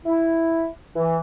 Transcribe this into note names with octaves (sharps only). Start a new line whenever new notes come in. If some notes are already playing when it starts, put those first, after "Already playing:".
E4
E3